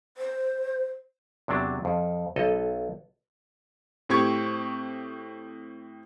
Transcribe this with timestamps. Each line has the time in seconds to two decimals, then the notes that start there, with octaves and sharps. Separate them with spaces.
0.17 C5
1.48 E2 C3 F#3 D4
1.85 F2
2.36 B1 A4 D#5
4.09 A2 C4 G4 C#6 G#6